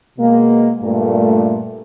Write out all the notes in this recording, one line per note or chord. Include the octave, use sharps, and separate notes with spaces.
B2 G#3 A#3
G2 A#2 A3